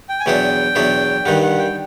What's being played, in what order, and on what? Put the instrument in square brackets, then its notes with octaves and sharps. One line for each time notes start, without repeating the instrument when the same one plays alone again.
[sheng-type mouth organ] G5
G#5
[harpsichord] E2 B2 F#3 B3 D4 [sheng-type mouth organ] G5
[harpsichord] E2 B2 F#3 B3 D4
[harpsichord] G2 D#3 G3 [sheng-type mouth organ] F#5
[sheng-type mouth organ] F#5
G5